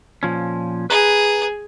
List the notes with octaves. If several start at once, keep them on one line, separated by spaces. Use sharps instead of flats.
A#2 F3 C#4
G#4 B4 A#5